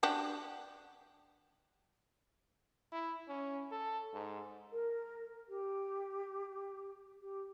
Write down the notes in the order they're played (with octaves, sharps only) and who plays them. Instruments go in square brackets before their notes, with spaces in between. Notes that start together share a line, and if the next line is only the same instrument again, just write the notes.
[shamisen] D4 F#4 G4
[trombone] E4
C#4
A4
G#2
[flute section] A#4
G4
G4